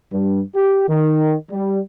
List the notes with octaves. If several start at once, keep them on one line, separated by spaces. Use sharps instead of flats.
G2
G4
D#3
G3